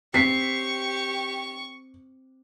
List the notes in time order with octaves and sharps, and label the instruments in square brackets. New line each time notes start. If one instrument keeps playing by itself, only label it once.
[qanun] C4 [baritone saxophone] G4 [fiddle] C#6 [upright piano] B6 C7